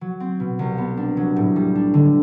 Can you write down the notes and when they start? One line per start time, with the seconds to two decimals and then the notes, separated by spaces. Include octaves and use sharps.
0.01 F#3
0.20 C4
0.40 B2
0.59 C2
0.78 B3
0.97 D4
1.17 F#3
1.36 A2
1.56 G3
1.75 D4
1.94 D3